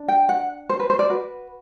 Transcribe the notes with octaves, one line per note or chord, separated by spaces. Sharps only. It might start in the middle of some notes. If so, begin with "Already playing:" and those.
Already playing: D4
G5
F#5
C5
B4
C5
D5
F#4 B4